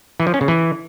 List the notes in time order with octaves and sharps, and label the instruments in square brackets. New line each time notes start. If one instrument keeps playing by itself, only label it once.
[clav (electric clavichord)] E3
F3
C#4
C#3
E3